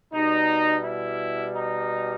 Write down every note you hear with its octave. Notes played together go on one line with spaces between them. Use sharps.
B2 G3 D#4
E4
D#4